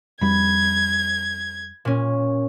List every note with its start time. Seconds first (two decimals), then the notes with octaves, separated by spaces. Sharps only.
0.21 F2 G3 B5 G#6
1.85 A#2 C#4